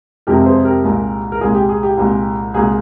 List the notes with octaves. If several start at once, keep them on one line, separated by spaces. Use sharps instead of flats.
F2 C3 F3 G#3 G4 A#4
G#4 C5
G4 A#4
C2 A#2 G#3
A#4
C2 A#2 G#3 G#4
G4
G#4
G4
C2 A#2 G#3
C2 A#2 G#3 G#4